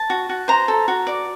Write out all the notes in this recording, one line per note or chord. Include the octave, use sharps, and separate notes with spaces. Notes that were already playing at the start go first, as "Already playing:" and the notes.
Already playing: A5
F#4
F#4
C5 A#5
A4
F#4
D5